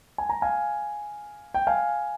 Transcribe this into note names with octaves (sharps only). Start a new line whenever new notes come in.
G#5
A#5
F5 G#5
G5
F5 G#5